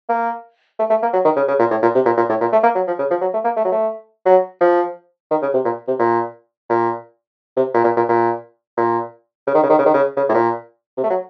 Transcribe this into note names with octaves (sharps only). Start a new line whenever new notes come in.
A#3
A3
A3
A#3
F#3
D#3
C#3
C#3
A#2
A2
A#2
C3
A#2
A#2
A2
A#2
A3
A#3
F#3
F3
C#3
F3
F#3
A3
A#3
A3
F#3
A3
F#3
F3
D#3
C#3
C3
A#2
C3
A#2
A#2
C3
A#2
A#2
A#2
A#2
A#2
C#3
D#3
C#3
D#3
C#3
D#3
C#3
C#3
A2
A#2
C3
A3
F#3